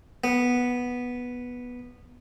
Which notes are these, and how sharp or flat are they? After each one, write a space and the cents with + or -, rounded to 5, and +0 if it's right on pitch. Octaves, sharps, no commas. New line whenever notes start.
B3 -5